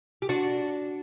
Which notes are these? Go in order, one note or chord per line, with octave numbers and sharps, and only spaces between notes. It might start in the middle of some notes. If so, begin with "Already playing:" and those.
G4
D4 F#4